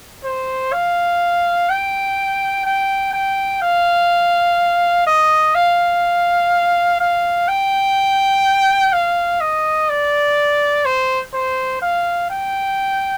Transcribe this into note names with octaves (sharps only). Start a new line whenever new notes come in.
C5
F5
G5
G5
G5
F5
D#5
F5
F5
G5
F5
D#5
D5
C5
C5
F5
G5